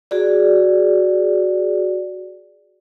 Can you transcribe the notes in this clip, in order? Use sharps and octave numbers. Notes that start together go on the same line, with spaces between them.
F#4 G#4 D5